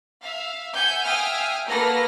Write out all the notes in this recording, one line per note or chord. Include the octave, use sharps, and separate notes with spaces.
E5 F5
E5 F#5 G#5 G6
E5 F5 G5 G#5 D#6 F6
A#3 F#4 A4 B4 F6 A#6